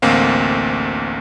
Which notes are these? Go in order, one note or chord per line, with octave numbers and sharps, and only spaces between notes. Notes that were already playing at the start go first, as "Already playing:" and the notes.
A1 D2 A#3 C4 F5